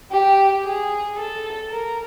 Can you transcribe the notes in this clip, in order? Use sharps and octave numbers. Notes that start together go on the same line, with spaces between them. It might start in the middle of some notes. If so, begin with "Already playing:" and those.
G4
G#4
A4
A#4